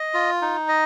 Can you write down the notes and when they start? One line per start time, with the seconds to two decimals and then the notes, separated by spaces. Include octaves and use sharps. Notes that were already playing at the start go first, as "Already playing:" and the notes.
Already playing: D#5
0.14 F4
0.42 D#4
0.68 D#5